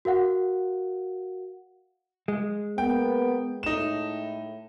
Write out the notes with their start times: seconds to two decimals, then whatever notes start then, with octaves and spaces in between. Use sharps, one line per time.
0.05 F#4 A#4 F5 F#5
2.28 G#3
2.78 A#3 B3 G5
3.63 A2 D#4 E7